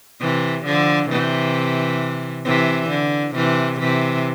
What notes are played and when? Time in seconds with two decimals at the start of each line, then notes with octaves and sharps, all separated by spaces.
0.21 C3 E3
0.66 D3 F3
1.10 C3 E3
2.45 C3 E3
2.90 D3
3.35 C3 E3
3.80 C3 E3